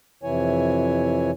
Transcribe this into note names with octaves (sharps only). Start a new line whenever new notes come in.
F2 C3 E3 E4 C#5 G#5